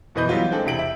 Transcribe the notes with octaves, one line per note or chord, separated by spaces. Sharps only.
F#1 B2 E3 B4 D#5 G6
E3 F#3 G3 B3 F4 F#4
G#3 C4 D4 A4 G5
E1 C3 E4 G4 D7 F#7
E5